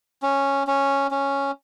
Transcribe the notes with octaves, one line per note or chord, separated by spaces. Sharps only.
C#4
C#4
C#4